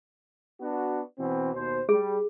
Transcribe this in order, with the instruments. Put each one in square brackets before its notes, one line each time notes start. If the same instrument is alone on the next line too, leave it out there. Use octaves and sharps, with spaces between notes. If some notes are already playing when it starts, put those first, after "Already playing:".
[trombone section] B3 D4 F#4
B2 E3 C4
D#2 B2 C5
[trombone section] G3 [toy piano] G#4